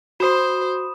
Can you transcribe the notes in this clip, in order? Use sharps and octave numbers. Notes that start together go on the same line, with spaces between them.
F#4 C5 B5 D#6 E7